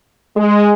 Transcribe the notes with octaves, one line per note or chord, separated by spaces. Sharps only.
G#3